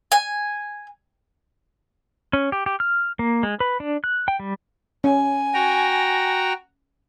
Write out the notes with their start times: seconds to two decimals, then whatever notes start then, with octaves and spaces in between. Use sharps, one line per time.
0.12 G#5
2.33 C#4
2.52 G4
2.66 G4
2.80 F6
3.19 A#3
3.43 G#3
3.60 B4
3.80 D4
4.04 F#6
4.28 G5
4.39 G3
5.04 C#4 G#5
5.54 F#4 G5 A#5